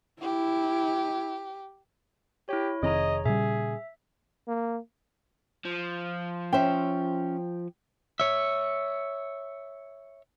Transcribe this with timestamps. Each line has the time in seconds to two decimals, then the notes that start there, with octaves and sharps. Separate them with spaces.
0.22 E4 G4
2.49 E4 G4 C#5
2.83 F1 D#3 C4 G#4 C#5 D#5 A#5
3.26 A#2 C#3 G3 G#4 E5
4.48 A#3
5.65 F3
6.53 C#4 C5 E5 G5
8.20 C#5 E5